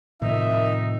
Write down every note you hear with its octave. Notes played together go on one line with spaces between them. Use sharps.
A2 C3 D#3 F3 D#4 E5